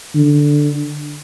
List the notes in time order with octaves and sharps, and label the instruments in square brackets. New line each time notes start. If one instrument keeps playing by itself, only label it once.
[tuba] D3